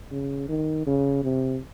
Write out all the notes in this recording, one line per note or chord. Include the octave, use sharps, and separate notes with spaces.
C#3
D#3
C#3
C3